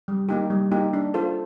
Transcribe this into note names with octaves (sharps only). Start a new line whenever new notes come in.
G3
A#3 D#4 G4
G3
A#3 D#4 G4
D4
F4 A4 C5